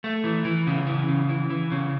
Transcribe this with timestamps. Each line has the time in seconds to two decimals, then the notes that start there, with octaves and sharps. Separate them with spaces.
0.04 A3
0.24 E3
0.45 E3
0.67 C#3
0.87 E3
1.08 C#3
1.29 E3
1.50 E3
1.72 C#3